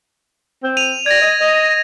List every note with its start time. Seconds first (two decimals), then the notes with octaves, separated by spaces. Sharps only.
0.63 C4
0.77 D#7 F7
1.06 D5 G#6 A#6
1.21 D#5
1.41 D#5